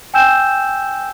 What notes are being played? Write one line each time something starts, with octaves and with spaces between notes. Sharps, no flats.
G5 G#5 E6 G6 E7